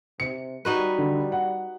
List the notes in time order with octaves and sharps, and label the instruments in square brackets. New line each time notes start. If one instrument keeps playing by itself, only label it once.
[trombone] C3 [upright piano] C#7
[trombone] G3 [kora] D#4 F#4 B4
[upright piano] D3
F#5